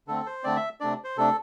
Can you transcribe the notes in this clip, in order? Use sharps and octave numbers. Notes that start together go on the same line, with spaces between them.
D3 A3 C4 A4
C5
D3 A3 C4 D5
E5
C3 A3 D4 D5
C5
C3 A3 D4 A4